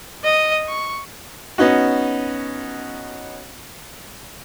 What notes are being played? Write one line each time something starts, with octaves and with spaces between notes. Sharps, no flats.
D#5
C#6
B3 C#4 D#4 F#4